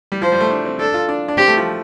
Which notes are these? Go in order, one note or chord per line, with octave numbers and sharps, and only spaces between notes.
G3
F3 C5
G3
A3
D4
C4
D4 A4
F4
D4
D4
C4 G4
A3
F3